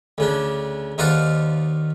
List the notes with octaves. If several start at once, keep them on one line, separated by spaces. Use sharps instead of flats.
D2 C#3 D4
D#2 D#4 F4 C5 D5 F#5